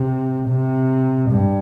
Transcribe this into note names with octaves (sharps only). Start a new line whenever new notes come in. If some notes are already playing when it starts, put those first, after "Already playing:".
Already playing: C3
C3
G2